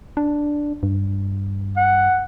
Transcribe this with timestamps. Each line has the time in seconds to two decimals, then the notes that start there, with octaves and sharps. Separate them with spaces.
0.17 D4
0.83 G2
1.77 F#5